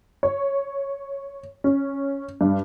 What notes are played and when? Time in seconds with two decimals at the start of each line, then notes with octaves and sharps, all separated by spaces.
0.23 C#5
1.64 C#4
2.41 G2